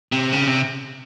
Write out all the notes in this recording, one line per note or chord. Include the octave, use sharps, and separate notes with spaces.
C3
C#3
C3